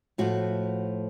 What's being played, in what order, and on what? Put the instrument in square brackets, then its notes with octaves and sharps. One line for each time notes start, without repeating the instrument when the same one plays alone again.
[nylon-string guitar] A2 F3 A3 F#4